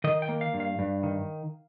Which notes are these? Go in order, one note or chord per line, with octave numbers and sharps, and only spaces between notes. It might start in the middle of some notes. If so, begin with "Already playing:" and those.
D#3 D#5
G5
A#3
F5
G2
F5
G2
D#3